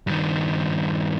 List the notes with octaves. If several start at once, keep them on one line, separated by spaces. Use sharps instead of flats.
G2 D#3